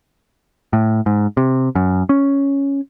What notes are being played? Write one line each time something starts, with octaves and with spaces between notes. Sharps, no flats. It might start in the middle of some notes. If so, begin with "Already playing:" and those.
A2
G#2
C3
F#2
C#4